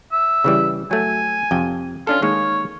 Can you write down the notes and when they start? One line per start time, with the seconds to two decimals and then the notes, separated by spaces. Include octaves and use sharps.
0.12 E5
0.44 C#3 E3 G3
0.91 F#3 A3 G#5
1.51 F2 C3 G5
2.07 C#4 D4 F4 A4
2.22 D#3 G#3 A#3 C#5